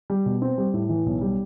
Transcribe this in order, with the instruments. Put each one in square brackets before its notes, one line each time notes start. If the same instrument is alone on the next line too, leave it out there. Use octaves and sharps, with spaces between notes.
[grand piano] G3
B2
C4
G3
A2
E3
B1
G3